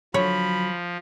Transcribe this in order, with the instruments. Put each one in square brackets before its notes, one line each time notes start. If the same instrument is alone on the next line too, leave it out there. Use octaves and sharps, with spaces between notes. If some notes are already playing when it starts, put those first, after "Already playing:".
[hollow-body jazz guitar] D3 F#3 [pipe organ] F3 [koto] C#5 [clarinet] B5